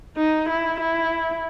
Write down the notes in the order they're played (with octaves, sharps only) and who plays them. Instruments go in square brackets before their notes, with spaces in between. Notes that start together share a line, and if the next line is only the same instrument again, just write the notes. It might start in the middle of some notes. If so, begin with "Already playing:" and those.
[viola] D#4
E4
E4